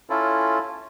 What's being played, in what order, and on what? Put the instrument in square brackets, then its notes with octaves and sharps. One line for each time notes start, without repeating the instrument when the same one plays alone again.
[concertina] C#4 E4 F4 A4